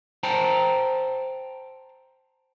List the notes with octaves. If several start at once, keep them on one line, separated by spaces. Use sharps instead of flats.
C5 G5 A5 A#5